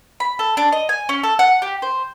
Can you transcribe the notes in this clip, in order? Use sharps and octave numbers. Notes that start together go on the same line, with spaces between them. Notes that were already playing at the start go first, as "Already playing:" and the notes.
B5
A4
D4
D#5
G#5
C#4
A4
F#5
G4
C5